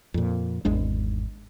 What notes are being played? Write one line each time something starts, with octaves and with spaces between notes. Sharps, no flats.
F2 A#2
G#1 E2 G#3 D4